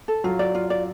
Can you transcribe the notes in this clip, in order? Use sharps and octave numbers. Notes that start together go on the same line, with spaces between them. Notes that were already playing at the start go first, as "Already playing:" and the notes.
A4
F#3 F4
D5
F4
D5